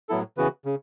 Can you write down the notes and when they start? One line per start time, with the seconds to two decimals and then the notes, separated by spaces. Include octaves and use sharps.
0.09 A2 F#3 B3 E4 A4
0.37 C#3 E3 B3 F#4 B4
0.65 C#3